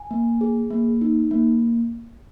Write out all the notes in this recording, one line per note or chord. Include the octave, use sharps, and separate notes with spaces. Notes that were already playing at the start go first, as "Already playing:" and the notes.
Already playing: G#5
A#3
G#4
A#3
D#4
A#3